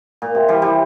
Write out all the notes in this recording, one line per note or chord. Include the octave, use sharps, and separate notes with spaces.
A#2
C3
E3 G3
E3 G3